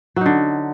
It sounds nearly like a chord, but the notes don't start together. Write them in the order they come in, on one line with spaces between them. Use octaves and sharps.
F#3 D#4 D3